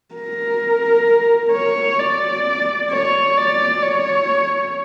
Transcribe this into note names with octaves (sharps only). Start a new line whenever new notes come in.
A#4
C#5
D5
C#5
D5
C#5